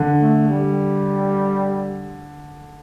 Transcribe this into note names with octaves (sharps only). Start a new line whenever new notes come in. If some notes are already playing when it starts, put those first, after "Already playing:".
Already playing: D3
A3
G3